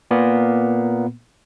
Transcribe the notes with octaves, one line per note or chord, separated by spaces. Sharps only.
A#2 A#3 B3